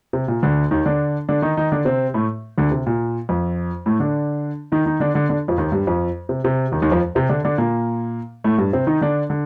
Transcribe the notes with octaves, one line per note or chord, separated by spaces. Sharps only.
C3
A#2
D2 D3
D#2 D#3
D3 D4
D3 D4
D#3 D#4
D#3 D#4
D3 D4
C3 C4
A2 A3
D2 D3
C3
A#2
F2 F3
A2 A3
D3 D4
D#3 D#4
D#3 D#4
D3 D4
D3 D4
D3 D4
F2 F3
D#2 D#3
G2 G3
F2 F3
C3
C3
D#2 D#3
D#2 D#3
F2 F3
C3 C4
D3 D4
D3 D4
A#2 A#3
A2 A3
G2 G3
C3 C4
D#3 D#4
D3 D4
D3